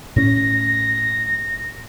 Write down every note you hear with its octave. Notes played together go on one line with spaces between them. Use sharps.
A2 C#4 A#6